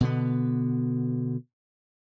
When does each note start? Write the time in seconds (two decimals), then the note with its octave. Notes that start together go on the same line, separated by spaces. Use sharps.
0.01 B2 D3 B3